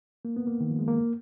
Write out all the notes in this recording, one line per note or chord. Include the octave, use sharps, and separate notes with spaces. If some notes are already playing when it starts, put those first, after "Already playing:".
A#3
B3
A#3
D#3
F3
G#3
A#3